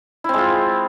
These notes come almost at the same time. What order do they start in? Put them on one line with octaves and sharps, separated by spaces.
E4 C4 G#3 F4